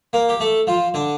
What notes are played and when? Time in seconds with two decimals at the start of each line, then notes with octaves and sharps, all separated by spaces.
0.13 A#3 A#4
0.29 G4
0.40 A3 A4
0.67 F3 F4
0.94 D3 D4